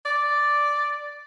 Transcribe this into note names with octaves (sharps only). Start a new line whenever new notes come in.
D5